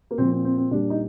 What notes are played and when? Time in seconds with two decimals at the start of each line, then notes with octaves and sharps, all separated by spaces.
0.11 A#3
0.18 A#2 F3 C4
0.31 C4
0.45 C4
0.58 C4
0.71 A#2 G3 D4
0.90 D#4